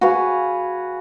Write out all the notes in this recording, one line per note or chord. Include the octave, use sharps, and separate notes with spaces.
F#4 G#4 B4 F5